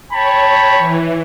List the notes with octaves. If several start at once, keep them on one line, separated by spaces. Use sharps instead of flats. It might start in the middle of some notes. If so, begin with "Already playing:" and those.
C#5 G5 A5 B5
E3